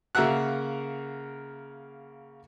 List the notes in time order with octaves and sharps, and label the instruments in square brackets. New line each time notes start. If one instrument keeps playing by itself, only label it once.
[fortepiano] C#3 A#3 A#4 E5 F#5 F#6